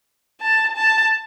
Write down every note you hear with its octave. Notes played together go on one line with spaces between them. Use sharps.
A5
A5